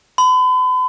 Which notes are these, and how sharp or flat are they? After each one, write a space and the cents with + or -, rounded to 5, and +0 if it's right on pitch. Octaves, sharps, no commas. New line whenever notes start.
B5 +40